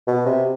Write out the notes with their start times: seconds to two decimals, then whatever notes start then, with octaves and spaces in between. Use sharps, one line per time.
0.07 B2
0.26 C3